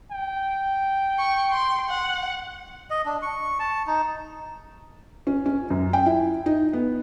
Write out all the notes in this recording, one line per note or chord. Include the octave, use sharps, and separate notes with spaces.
G5
C#6
C6
F#5
D#5
D4
C#6
A5
D#4
C#4
C#4
F#2
G5
E4
D#4
B3